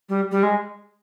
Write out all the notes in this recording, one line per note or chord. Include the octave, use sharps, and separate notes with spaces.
G3
G3
G#3